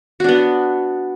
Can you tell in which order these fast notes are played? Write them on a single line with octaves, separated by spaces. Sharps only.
F#4 D4 B3